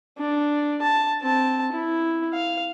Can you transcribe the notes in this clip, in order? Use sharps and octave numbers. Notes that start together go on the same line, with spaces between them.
D4
A5
C4 A5
E4
F5